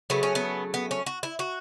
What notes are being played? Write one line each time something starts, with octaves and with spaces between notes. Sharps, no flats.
C#3 F#3 A3 B3
C#4
B3
B3
C#4
F#4
E4
F#4